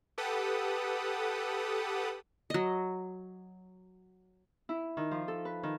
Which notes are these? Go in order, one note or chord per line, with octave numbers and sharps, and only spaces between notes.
G4 A4 B4 F#5 D#6
F#3 D#5
E4
D#3
F3
A4
B4
D#3